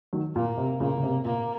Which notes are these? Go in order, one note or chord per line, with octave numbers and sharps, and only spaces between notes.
D#3 F#3
A#2 A#3
C3
A#2 C#3 A#3
C#3
C3
A#2 A#3